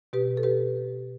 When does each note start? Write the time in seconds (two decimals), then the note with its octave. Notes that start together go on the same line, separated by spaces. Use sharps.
0.13 B2 G4 B4
0.37 A4
0.43 G4 B4